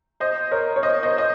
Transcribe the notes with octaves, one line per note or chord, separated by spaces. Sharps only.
C5 D#5
A#4 C#5
C#5
C5 D#5
C5 D#5
D#5